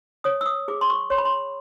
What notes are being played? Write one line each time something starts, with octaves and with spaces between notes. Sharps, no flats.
C#5 D#6
E6
D#6
G#4 D6
C6
C#6
C#5 C6
B5
C6